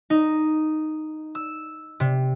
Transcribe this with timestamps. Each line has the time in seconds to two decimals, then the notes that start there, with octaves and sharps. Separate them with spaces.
0.10 D#4
1.35 E6
2.00 C3